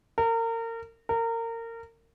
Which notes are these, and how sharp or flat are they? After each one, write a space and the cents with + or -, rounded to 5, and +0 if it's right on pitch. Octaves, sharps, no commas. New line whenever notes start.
A#4 -30
A#4 -25